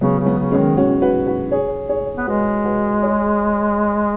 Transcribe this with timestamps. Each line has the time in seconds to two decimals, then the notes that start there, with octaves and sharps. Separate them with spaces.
0.01 C#3 F#3 B3
0.20 C#3
0.26 F#3 B3
0.39 C#3
0.51 G#3 C#4
0.58 D#3
0.77 C#4 F#4
1.02 F#4 B4
1.26 F#4 B4
1.51 G#4 C#5
1.89 G#4 C#5
2.17 B3
2.27 G#3 F#4 B4
2.65 F#4 B4
3.03 G#4 C#5